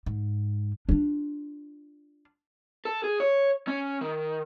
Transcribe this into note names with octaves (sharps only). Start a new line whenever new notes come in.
G#2
D4 F4
A4
G#4
C#5
C#4
D#3